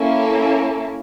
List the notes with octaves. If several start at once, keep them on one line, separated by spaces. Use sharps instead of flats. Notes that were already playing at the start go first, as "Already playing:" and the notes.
Already playing: A#3 C#4 E4 A4